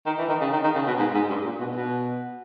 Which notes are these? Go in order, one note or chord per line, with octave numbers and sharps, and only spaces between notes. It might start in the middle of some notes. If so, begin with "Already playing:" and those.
D#3
E3
D#3
C#3
D#3
D#3
C#3
B2
G#2
G#2
G2
A#2
B2
B2